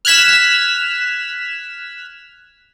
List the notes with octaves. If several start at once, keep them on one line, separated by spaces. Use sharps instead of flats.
F6 F#6 G#6 B6 E7